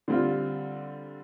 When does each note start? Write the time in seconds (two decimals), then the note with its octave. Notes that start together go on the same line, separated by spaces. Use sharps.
0.08 D3 G3 C4 F4